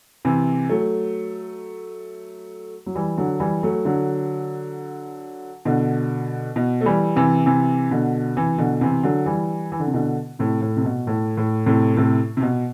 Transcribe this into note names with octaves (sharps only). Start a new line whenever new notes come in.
C3 E3
F#3 A3
F#3
E3 G3
D3 F#3
E3 G3
F#3 A3
D3 F#3
B2 D3
B2
A3
E3 G3
C3 E3
C3 E3
B2 D3
C3 E3
B2 D3
C3 E3
D3 F#3
E3 G3
E3
D3
C3
B2 D3
A2 C3
A2
C3
B2
A2
A2
A2 C3
A2 C3
C3
B2